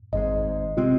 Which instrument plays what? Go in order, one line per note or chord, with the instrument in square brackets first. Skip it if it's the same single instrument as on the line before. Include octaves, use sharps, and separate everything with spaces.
[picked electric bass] G#1 G#2 G#3 [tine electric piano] D#5
[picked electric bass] C3 G#3 C4 [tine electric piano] F4